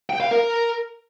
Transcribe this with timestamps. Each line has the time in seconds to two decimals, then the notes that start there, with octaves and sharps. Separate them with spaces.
0.10 G5
0.20 F5
0.31 A#4